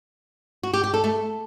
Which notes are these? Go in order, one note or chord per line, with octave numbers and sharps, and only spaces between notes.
F#4
G4
G4
A4
A3